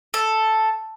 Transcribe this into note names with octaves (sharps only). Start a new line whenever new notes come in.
A4